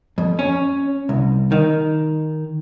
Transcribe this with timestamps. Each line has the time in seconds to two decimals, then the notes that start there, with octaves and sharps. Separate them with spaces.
0.18 F2
0.39 C#4
1.09 C2
1.52 D#3